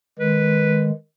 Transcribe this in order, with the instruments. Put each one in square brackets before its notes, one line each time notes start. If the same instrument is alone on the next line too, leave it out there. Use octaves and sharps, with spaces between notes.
[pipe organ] D#3 G#3 [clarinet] B4